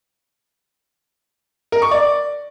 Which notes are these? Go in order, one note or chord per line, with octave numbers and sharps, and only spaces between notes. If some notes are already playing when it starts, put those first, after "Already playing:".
A#4
C#6
D5